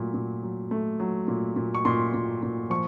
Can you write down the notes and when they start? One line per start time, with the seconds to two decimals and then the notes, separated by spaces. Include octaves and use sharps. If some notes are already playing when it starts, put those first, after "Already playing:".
Already playing: A#2 F#3 A3
0.14 A#2
0.43 F#3
0.71 A3
1.00 F#3
1.28 A#2
1.56 A#2
1.75 C#6
1.85 A#2 C6
2.14 A#2
2.43 A#2
2.70 F3 C#6